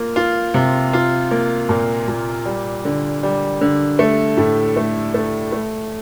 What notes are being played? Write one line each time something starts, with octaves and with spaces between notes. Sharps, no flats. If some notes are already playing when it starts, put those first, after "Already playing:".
Already playing: A#3 F4
F4
C3
F4
A#3
A#2
A#2
G3
D3
G3
D3
A3
A2
A3
A3
A3